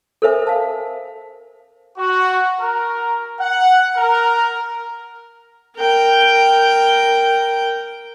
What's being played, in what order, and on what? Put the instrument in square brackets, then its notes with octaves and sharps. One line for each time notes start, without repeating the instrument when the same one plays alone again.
[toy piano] A4 A#4 C5 E5 G#5
F5 A5
[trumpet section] F#4
A#4
F#5
A#4
[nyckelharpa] A#4 G5